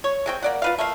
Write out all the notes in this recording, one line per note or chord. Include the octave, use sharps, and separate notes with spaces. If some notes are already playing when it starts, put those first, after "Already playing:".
C#5
G#3 C4 G5
A#3 D5 F#5
F4 B4 F5
A3 A#3 F5